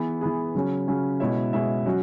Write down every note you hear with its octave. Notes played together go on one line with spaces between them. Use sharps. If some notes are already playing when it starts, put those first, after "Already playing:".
Already playing: E3 B3 G#4
E3 B3 G#4
C#3 F#3 C#4
C#3 F#3 C#4
B2 G#3 E4 C#5 E5
B2 G#3 E4 C#5 E5
F#3 C#4 F#4